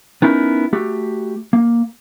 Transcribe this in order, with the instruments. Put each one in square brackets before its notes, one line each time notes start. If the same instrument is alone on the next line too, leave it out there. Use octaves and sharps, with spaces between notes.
[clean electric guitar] B3 C#4 D#4 E4 A#4
A3 F#4 G4
A#3